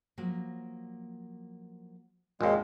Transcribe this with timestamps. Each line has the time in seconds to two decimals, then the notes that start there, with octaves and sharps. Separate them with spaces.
0.18 F3 F#3 A#3
2.41 G#1 D#2 G#3